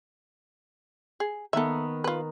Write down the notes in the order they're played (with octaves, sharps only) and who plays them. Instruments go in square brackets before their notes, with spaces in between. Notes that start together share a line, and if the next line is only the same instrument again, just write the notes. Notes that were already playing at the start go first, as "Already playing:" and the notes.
[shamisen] G#4
[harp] D#3 B3 [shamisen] A4 E5
[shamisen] F4 B4